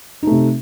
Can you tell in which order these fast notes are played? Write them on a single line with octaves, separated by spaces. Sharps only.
D#4 A3 C3